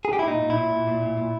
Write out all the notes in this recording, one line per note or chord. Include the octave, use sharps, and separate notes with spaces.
G#4
G4
E4
A#2 D#4
A#2
E4
A#2
A#2
A#2
A#2
A#2